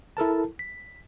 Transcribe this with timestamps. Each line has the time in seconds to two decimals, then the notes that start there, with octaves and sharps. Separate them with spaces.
0.17 E4 A4 A#4 A5
0.59 B6